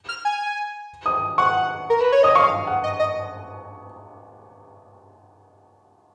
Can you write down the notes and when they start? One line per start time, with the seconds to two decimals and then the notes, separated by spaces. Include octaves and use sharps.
0.09 F6
0.25 G#5
1.06 D#6
1.38 F#5 C#6
1.90 A#4
2.01 B4
2.12 C#5
2.23 D#5 D#6
2.35 F5 C#6
2.67 F#5
2.84 D#5
2.99 D#5